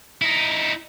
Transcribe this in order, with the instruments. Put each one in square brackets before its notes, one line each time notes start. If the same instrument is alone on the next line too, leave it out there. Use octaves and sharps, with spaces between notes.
[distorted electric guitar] D#4 E4